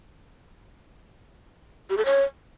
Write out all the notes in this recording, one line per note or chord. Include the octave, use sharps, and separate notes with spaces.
G4
A4
C#5